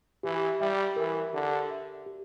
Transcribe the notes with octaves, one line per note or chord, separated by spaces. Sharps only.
E3 G4
G3 E5
E3 A#4
D3 G4
E5
G4